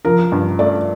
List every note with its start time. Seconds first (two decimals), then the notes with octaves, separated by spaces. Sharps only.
0.05 F3 A#4
0.32 G2
0.59 A3 D5